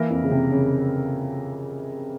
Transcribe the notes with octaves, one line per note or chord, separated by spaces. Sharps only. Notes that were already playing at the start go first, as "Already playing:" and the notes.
Already playing: E3 A#3 E4 A#4 E5
F2
C#3
C3
C#3